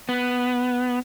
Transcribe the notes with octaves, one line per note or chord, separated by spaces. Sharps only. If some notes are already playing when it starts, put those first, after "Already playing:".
B3